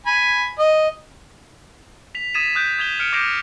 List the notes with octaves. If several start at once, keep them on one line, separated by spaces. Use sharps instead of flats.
G#5 B5
D#5
B6 F7
D#6 G#6 A6 B6 D#7 E7
D#6 F#6 G6 D7
D#6 G#6 F7 G7
F6 C#7 D7
D6 G6 A#6 C7 D7 F7